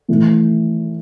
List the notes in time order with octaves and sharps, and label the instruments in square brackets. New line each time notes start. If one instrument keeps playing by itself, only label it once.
[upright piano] A2 E3 A3